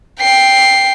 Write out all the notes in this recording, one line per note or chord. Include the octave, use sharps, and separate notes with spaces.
G5 C7